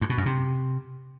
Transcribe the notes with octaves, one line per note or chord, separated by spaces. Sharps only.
G2
B2
F#2
C3